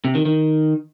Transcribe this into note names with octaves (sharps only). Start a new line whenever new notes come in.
C3
D#3
D#3